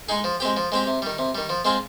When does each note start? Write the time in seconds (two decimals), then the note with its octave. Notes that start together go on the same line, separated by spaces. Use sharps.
0.09 G#3 D#4 G#4
0.24 F3
0.40 G#3 C4 G4
0.57 F3
0.72 G#3 C4 G4
0.87 C3
1.02 D#3 G3
1.19 C3
1.35 D#3 G3
1.49 F3
1.65 G#3 C4 F4 G#4